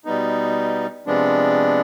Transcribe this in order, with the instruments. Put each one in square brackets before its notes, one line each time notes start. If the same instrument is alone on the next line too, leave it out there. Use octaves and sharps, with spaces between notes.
[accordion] B2 G3 B3 D#4
C3 F3 G#3 B3 D4